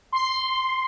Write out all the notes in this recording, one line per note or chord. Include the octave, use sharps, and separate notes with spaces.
C6